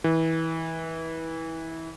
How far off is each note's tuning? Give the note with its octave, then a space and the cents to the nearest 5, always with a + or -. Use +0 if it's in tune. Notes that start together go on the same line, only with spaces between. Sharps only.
E3 -20